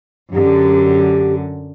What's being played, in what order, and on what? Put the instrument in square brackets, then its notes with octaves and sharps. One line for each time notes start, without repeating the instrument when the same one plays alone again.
[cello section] F#2 D3 [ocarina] G4